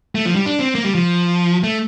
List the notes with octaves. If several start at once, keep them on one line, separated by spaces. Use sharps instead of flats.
A3
F3
G3
D4
C4
A#3
G3
F3
A3